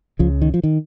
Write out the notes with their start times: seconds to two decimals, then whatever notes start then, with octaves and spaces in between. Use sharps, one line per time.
0.19 C#2 C#3 F3
0.42 D#3
0.54 F3
0.64 D#3